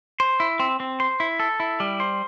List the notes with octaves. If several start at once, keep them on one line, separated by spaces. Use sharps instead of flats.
C5
E4
C4
C4
C5
E4
A4
E4
G3
C5